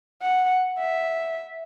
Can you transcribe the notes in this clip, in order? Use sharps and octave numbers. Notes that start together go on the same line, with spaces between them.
F#5
E5